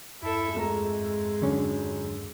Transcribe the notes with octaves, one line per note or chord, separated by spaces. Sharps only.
E2 G2 E4 A4 E5
F2 G#3 A3 A#5
D3 F#3 C#4